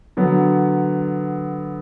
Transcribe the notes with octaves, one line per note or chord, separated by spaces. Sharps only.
D3 F#3 B3